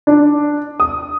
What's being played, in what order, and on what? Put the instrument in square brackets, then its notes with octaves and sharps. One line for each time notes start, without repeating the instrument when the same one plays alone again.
[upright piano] D4
D#6